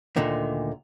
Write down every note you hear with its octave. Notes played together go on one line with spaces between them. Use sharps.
D2 A#2 D3 D#3